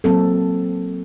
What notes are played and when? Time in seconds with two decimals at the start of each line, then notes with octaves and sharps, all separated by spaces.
0.04 F#3 A#3 C4 A4